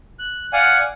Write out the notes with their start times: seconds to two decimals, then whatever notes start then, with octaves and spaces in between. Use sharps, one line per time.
0.19 F#6
0.53 D5 F5 F#5 G#5